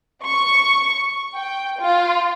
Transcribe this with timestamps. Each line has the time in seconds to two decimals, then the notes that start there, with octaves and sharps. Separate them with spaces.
0.24 C#6
1.33 G5
1.79 F4